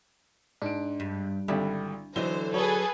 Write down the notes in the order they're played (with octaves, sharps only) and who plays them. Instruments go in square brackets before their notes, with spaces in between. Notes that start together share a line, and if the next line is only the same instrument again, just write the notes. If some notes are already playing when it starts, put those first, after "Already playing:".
[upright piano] G#2 D7 [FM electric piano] D4
[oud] G2
[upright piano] G#1 D3 G3 [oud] E4
[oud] D3 D#5 [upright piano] E3 F#3 G7 [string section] C5
[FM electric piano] F#3 [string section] G#4 A4 B4 [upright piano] C#5